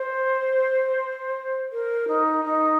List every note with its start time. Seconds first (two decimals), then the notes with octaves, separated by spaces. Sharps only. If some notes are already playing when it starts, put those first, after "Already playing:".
Already playing: C5
1.72 A#4
2.08 D#4
2.45 D#4